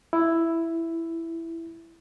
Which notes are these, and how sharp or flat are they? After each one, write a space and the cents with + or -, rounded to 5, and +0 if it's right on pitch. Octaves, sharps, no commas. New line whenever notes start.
E4 +5